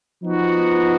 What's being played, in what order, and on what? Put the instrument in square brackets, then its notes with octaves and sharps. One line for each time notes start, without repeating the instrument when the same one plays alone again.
[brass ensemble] F3 B3 D#4 F#4